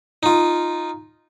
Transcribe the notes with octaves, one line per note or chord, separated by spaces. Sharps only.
D#4 F4